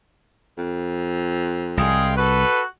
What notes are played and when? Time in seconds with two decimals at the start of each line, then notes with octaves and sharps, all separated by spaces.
0.58 F2
1.77 C2 G#3 G#4 F5 G5
2.17 F#4 A4 B4